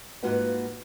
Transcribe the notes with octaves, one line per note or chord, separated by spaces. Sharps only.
G#2 A#3 F4 F#4 B4 F#5